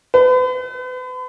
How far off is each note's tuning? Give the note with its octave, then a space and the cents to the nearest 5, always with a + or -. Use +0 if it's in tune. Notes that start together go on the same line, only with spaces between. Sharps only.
B4 +40